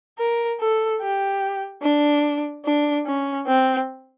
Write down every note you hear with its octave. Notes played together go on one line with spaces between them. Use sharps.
A#4
A4
G4
D4
D4
C#4
C4